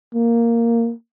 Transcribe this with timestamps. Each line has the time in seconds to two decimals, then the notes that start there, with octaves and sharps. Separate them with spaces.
0.14 A#3